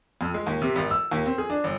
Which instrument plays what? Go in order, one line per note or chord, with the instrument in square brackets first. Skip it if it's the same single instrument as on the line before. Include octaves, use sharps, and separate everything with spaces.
[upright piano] F2
G#3
D#2
C3
G#1
E6
D#2
C4
G#4
D4
G1